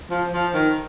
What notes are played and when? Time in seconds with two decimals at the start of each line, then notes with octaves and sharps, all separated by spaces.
0.11 F3
0.33 F3
0.54 D#3